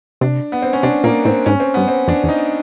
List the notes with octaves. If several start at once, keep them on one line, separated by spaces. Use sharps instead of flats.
C3 D4
B3
C4
C#4
C3 D4
A#2 A#3
A2 C4
G#2 C#4
C4
G2 B3
C4
F2 D4
E2
D#4